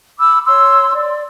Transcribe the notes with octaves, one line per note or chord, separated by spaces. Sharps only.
B5 D6 E6
C#5 C6 E6
D5